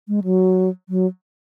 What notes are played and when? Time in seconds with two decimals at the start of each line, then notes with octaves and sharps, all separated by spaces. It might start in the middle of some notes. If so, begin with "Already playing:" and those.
0.08 G#3
0.24 F#3
0.89 F#3